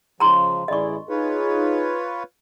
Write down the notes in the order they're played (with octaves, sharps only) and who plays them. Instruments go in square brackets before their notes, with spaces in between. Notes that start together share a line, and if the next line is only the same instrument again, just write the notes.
[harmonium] C#3 F3 G#3 [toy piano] A#5 C6
[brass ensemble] A1 G#4 D5 [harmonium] E4 [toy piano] D#5 C#6
[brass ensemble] D#4 G#4 [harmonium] F4 B4 C#5